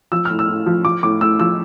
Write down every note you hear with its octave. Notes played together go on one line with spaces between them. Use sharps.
F3 E6
A2 F6
E6
A2
F3
F3 D6
A2 D6
A2 E6
F3 E6